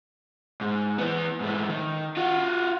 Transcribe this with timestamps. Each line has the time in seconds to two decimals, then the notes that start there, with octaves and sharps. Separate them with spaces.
0.61 G#2
0.98 E3 B3
1.41 G#2 A3
1.69 D#3
2.17 F4 F#4